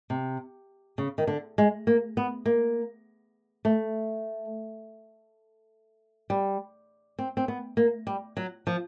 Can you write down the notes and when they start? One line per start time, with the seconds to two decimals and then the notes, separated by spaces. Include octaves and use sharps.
0.10 C3
0.98 C#3
1.18 D#3
1.27 D3
1.58 G#3
1.87 A#3
2.17 B3
2.46 A#3
3.65 A3
6.30 G3
7.19 C4
7.37 C4
7.48 B3
7.77 A#3
8.07 G3
8.37 F#3
8.67 F3